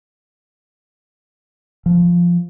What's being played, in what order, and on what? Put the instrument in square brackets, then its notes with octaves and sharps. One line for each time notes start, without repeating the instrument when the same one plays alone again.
[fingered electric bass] F3